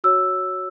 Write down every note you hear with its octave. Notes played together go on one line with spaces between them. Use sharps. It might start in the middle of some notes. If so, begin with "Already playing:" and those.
F#4 C#5 E6